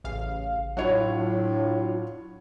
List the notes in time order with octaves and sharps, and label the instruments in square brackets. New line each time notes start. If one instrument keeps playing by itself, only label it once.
[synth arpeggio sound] A1 C#3 F5
[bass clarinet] A2 [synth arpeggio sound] F#3 D4 F4 [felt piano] E4 C#5 F#5